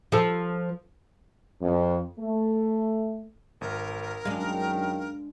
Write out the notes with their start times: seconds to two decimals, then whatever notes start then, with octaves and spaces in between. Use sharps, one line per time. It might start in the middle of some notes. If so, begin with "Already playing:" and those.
0.12 F3 A4
1.62 F2
2.19 A3
3.61 G#1 A#4
4.25 F#2 D#3 G#3 D4 F5